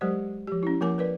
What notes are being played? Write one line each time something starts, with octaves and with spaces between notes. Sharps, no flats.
F#3 G#3 G4 A#4 C5 D5
F3 G4
C#4 E4
F3 A#3 A#4 G#5 D6
A#4 B4 D5